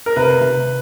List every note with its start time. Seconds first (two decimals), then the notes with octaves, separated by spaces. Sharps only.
0.06 A#4
0.16 C3 B4
0.41 C3